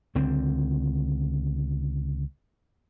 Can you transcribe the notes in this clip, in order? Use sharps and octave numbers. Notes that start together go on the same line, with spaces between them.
C#2 D3 C4